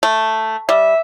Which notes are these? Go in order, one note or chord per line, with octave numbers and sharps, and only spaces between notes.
A3
G3 E5